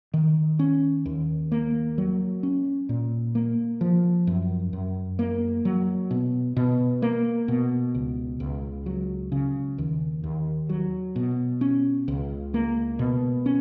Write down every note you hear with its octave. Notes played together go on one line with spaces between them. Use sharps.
D#3
C#4
D#2
A#3
F#3
C#4
A#2
A#3
F3
F#2
F#2
A#3
F#3
B2
B2
A#3
B2
C#2
C#2
F#3
C#3
D#2
D#2
F#3
B2
C#4
C#2
A#3
B2
C#4